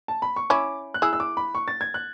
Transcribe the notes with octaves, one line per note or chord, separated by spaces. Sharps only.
A5
B5
C#6
C#4 E4 D6
F#6
E4 G#4 E6
E6
D6
B5
C#6
A6
G#6
F#6